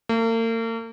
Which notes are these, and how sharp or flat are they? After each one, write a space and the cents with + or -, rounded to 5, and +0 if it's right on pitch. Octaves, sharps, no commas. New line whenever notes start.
A#3 -45